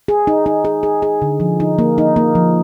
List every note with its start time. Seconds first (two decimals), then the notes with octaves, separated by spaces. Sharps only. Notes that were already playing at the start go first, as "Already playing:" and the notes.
0.08 G#4
0.27 D#4
0.46 D#4
0.65 G#4
0.83 G#4
1.02 G#4
1.22 D3
1.40 F3
1.60 D#4
1.79 A#3
1.98 D#4
2.16 A#3
2.35 F3